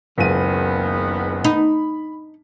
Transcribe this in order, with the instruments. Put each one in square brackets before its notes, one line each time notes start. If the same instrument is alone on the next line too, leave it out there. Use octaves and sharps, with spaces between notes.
[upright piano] F#1 C#2 D#7 [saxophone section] D#3 B3
[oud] D#4 [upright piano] B5